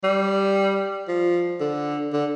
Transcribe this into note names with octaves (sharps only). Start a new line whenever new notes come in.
G3
F3
D3
D3